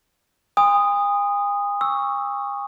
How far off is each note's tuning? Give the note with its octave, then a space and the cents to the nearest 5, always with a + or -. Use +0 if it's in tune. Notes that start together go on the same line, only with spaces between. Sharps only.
G#5 -45 C6 -30 D#6 -5
C#6 +0 E6 +0